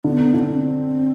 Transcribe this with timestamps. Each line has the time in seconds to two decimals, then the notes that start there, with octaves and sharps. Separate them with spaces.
0.04 D3 B3
0.34 D3 C4 E4